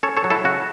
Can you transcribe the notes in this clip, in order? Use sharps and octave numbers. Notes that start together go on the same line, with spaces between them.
C#4 A4 C#5
A4 C#5
F#3
E4 A4
C#3 F#4